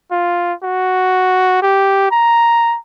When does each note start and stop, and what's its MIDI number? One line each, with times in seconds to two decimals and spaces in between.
0.12 0.53 65
0.63 1.60 66
1.63 2.08 67
2.11 2.77 82